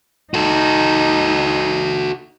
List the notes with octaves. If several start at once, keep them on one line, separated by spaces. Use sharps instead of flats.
D#4 F#4 A4